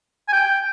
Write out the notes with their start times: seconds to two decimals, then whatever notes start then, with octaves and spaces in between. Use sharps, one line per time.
0.28 G#5
0.33 G5